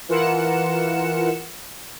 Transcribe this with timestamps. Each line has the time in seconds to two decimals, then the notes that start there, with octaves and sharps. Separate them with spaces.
0.09 E3 F4 A#4 F#5 C#7 E7